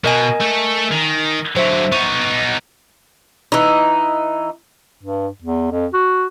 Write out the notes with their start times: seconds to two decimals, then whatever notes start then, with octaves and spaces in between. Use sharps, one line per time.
0.04 B2 A#4 D#5 G#5
0.40 A3 A4
0.92 D#3
1.57 D3 F#3 C5 E5
1.92 B3 D#4 C#6
3.52 E3 D#4
5.03 G2
5.42 E2
5.71 F2
5.93 F#4